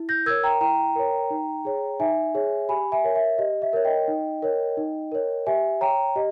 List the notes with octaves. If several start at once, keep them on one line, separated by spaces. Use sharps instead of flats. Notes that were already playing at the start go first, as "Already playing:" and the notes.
Already playing: E4
G6 A#6
A#4 C#5 E6 G#6
G5 A#5
E4 G5 A#5
A#4 C#5
D#4
G#4 C#5
D#4 E5 G#5
G#4 C#5
G4 G#5 B5
E5 G#5
A#4 C#5
E5
G4 D#5
E5
A#4 C#5
D#5 G5
D#4
A#4 C#5
D#4
A#4 C#5
G4 E5 G#5
C#5 G5 A#5
G4 D#5